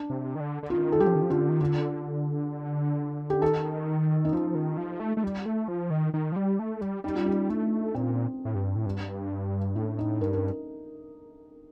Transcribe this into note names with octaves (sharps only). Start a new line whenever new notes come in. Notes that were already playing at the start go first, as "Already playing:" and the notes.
Already playing: D4
C3
D#3
D3
D3
D#3 F4
A4
G3 G4
F3
D#3
F3
D3 F4
D#3
D3 F4
G4
D#3 A4
D#4
F3 F4
D#3
F3
A3
A3
G3
A3
F3
D#3
D#3
F3
G3
A3
G3
G3 D#4
F4
D#4
A3 D4
A#2 C4
A2
G2
A2
G2
A2 D4
D#4
G2 A#4
A#4